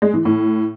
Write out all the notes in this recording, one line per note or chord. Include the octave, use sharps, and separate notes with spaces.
G#3
E3
A2